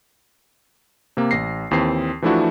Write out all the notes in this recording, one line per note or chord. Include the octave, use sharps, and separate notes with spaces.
C3 A#3
A1 A#6 C7
D#2 E3 C4 C7
E3 F3 A3 D4 E4 F#4